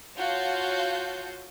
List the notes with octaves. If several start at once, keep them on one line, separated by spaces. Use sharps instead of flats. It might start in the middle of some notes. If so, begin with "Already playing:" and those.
F4 F#4 C#5 F5 A5 G6